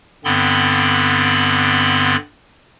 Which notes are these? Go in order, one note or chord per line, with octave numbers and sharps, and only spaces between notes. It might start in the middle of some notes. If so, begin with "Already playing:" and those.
G2 D3 B3 C4 B5 C6